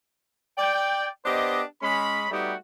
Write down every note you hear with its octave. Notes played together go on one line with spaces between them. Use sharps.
D5 G5
B3 D4 G4 C5 D#5
G#3 C#4 B5
G3 A3 B3 D#4 F#4 G4